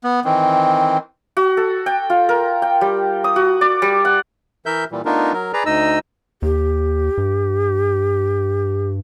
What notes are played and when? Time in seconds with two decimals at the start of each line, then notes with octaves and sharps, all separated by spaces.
0.04 B3
0.25 D#3 E3 C4
1.37 F#4
1.57 A4
1.86 G5
2.10 F4
2.29 A#4
2.62 G5
2.81 G3
3.24 D#6
3.36 F#4
3.61 D5
3.82 G3
4.05 F#5
4.66 E3 A#4 E5 G6
4.92 A#2 E3 G3
5.05 A3 B3 D4 D#4 F4 A#4
5.33 F#3 A#4
5.53 G#4 B4 D5 A#5
5.66 D2 D#4 D#5 E6
6.42 D#2 G4
7.18 G2